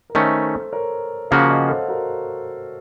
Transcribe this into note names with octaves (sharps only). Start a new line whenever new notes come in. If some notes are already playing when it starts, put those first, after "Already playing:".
A#4
D#3 A3 C#4 A4 C5
A#4 C#5
C#3 F3 A#3 C#4 F#4 C#5 F5
D#5 F#5
A4 C5
F#4 A#4